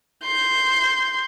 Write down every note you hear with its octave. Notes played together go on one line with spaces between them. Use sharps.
C6 G6